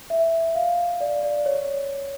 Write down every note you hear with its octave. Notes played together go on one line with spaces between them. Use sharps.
E5
F5
D5
D5
C#5